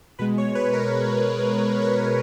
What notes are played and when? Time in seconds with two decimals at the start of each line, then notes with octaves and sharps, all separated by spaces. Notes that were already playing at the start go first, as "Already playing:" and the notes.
0.19 B2 G#3 B4
0.38 C#5
0.55 B4
0.73 A#4
1.82 C#5